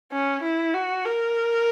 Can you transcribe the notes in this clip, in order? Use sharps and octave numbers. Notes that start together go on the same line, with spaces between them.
C#4
E4
F#4
A#4